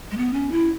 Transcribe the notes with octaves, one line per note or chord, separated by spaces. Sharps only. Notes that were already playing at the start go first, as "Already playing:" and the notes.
G#3
B3
C#4
E4